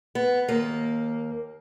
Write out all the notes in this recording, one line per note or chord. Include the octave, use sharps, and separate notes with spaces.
B3
D#2 A#3